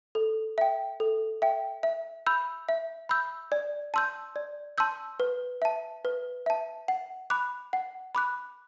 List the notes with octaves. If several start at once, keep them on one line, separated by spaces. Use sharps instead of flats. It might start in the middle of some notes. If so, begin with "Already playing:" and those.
A4
E5 G5
A4
E5 G5
E5
B5 E6 G6
E5
B5 E6 G6
D5
A5 C6 E6 G6
D5
A5 C6 E6 G6
B4
E5 A5
B4
E5 A5
F#5
B5 D6 F#6
F#5
B5 D6 F#6